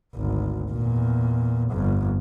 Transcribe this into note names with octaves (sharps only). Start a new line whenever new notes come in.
G#1 D2
E2 A#2
G1 F2